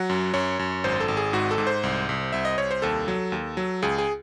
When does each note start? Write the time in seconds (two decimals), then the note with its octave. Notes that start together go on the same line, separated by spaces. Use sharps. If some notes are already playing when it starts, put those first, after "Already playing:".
Already playing: F#3 F#5
0.10 F#2
0.34 F#2 C#5
0.59 F#2
0.84 G#1 C5
1.00 A4
1.08 G#1
1.17 G#4
1.33 G#2 F#4
1.51 A4
1.58 G#2
1.67 C5
1.83 C2
2.09 C2
2.32 C2 E5
2.45 D#5
2.58 C2 C#5
2.71 C5
2.82 D#2 A4
3.08 F#3
3.32 D#2
3.57 F#3
3.82 C#2 G#4
3.98 G#4